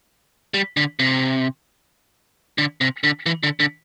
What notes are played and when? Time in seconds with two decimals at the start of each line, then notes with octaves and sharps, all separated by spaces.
0.54 G3
0.77 D3
0.99 C3
2.58 D3
2.81 C3
3.04 D3
3.26 E3
3.43 D3
3.60 D3